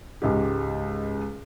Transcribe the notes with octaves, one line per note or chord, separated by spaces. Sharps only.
C#2 G#2 G4